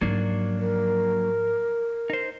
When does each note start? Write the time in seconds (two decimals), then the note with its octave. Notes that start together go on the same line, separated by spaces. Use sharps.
0.01 G#2 F3 F#3 A#3 D4
0.59 A#4
2.10 D#4 C5